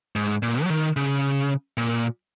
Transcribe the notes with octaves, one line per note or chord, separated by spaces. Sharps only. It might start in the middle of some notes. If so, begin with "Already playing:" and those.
G#2
A#2
F#3
D#3
C#3
A#2